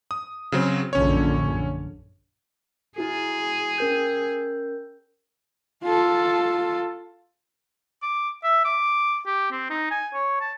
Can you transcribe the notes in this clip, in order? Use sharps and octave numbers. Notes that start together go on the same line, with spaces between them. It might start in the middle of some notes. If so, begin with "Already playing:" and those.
D#6
C#3 F#3 C4
A#1 F#2 D3 C#4 C#5
E4 F#4 G#4
C#4 A#4 G6
F4 A4
D6
E5
D6
G4
C4
D#4
G#5
C#5
A5